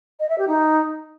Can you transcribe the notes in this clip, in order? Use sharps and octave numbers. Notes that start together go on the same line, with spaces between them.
D#5
E5
G4
D#4